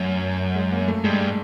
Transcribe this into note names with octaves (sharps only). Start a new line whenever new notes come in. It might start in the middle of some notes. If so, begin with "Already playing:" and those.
Already playing: F#2 A3
G#3
A#3
A3
G2 G#3
G#3